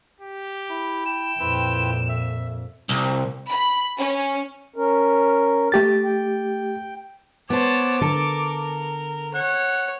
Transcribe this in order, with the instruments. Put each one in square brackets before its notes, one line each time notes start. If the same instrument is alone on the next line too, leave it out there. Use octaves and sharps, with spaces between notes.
[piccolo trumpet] G4
[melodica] E4
[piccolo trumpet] G5 [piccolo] E7
[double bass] F2 A#2 [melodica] C4 E4 B4
[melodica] E5
[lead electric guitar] C2
[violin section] B5
C#4
[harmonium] C#4 A#4
[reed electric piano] A3 G4 A6
[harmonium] G5
[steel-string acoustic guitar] B3 C5 [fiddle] C#5 A5 [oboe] D6
[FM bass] D3 [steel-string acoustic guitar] A4 [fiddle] A#4
[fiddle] C#5 [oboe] F#5